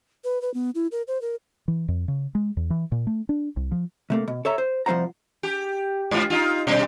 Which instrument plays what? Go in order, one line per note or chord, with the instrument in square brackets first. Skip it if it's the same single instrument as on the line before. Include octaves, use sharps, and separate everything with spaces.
[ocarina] B4
B4
B3
E4
A#4
C5
A#4
[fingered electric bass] E3
F2
C#3
G#3
E2
E3
A#2
A3
D4
C2
F3
[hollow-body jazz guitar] C3 A3 A#3
B2
A4 C#5 E5 A#5
C5
C2 F3 C4 C5 F#5 A#5
[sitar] G4
G#2 F4
D#4 F4
B2 G3